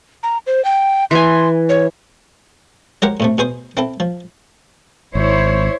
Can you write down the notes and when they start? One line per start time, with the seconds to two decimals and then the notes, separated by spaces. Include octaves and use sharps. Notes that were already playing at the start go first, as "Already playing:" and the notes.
0.23 A#5
0.47 C5
0.65 G5
1.11 E3 G#5 C6
1.69 C#5
3.02 F#3 G#3 G4 A#4 C5 F#5
3.20 A2 C3 A3
3.38 B2 G#4 C5 C6
3.77 C4 E4 A4
4.00 F3
5.15 G#1 E4 C5 C#5